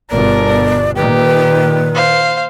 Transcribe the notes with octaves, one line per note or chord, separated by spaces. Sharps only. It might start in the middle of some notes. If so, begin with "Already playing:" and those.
G1 B2 A#4 D5
A#2 D#3 G4 B4
C5 F5